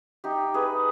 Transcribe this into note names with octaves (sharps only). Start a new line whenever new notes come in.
D#4 G4
G#4 B4